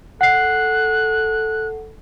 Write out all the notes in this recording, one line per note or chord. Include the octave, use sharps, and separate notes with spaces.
A4 F#5 F#6 C7